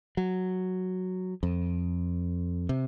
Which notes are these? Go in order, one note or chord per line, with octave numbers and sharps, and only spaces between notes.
F#3
F2
C3